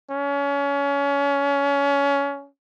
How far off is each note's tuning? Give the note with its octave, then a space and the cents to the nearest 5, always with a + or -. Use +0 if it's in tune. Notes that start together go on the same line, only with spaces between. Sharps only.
C#4 +25